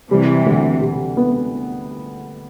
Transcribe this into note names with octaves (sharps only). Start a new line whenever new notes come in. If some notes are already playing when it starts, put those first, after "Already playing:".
C3 E3 G3
D2
C3
B3